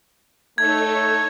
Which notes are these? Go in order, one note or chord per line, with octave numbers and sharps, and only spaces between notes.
A3 D#4 A4 C#5 G#6